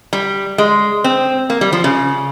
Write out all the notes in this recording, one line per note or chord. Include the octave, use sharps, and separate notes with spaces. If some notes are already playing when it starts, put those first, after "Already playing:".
G3
G#3
C4
A#3
G3
F3
C#3